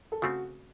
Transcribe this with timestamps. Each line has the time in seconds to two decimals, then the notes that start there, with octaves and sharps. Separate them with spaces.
0.12 A4
0.22 C#3 A3 C4 F#4